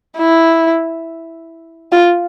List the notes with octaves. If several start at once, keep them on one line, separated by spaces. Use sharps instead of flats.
E4
F4